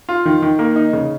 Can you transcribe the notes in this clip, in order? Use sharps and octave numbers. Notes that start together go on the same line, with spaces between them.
F4
D#3
D#3
A#3
D#4
C#3